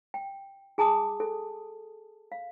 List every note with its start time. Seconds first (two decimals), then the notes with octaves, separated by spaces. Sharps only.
0.14 G5
0.78 G#4 G#5 A5 D6 D#6
1.20 A4
2.32 F5